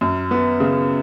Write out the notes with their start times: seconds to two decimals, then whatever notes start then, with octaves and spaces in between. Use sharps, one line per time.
0.01 F#2
0.31 B3
0.60 C#3